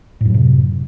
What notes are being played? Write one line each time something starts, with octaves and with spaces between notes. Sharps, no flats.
F#2 A2 C3 F#3